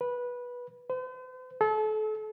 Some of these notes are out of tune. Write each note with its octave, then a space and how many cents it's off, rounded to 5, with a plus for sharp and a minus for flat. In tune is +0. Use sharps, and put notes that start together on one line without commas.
B4 -15
C5 -45
A4 -35